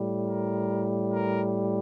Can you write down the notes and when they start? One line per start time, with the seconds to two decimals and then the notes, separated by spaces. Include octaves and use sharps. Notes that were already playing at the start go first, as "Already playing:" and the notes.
Already playing: A2 G3
0.23 A#4
1.09 A#4